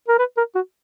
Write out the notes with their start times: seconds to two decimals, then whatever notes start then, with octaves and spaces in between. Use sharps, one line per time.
0.08 A#4
0.19 B4
0.37 A#4
0.55 F#4